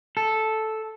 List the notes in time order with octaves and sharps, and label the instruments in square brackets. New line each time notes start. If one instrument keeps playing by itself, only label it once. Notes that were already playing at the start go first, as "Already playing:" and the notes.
[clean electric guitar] A4